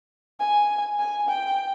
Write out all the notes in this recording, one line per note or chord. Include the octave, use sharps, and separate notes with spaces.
G#5
G#5
G5